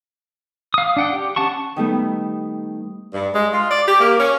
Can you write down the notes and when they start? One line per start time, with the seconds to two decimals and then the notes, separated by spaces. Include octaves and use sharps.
0.74 F5 D#6
0.97 D4 F#5 G5
1.13 G4
1.36 C#4 F#5 A5 C#6
1.76 D#3 G3 A3 B3
3.14 G2
3.34 G#3
3.53 F4
3.71 D5
3.87 G4
4.00 A#3
4.19 C#4